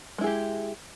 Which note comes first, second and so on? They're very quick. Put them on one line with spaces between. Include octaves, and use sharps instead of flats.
G#3 E4 G#4 G4